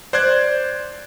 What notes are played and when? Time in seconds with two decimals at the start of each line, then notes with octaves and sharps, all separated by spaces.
0.13 C5 D5 F#6 G#6